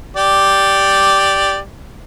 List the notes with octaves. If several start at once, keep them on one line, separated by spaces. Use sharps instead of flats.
G4 D5